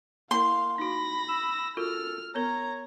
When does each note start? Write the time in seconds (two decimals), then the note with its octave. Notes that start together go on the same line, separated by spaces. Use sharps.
0.31 A#3 E4 A#4 F5 C6
0.78 D#4 F#4 B5 A#6
1.29 E6
1.77 F4 F#4 A4 A#4 F6
2.35 B3 A#4 C#5 A#5